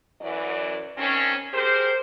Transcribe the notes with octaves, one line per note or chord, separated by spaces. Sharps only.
F#2 E3 D5
G2 D#3 C4 C#4
G4 G#4 A#4 C5